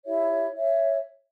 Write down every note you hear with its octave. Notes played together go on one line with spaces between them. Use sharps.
E4 G4 C#5 E5
C#5 E5